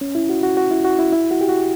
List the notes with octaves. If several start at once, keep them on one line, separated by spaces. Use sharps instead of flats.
C#4
E4
F#4
F#4
F#4
E4
F#4
E4
E4
F#4
G4
F#4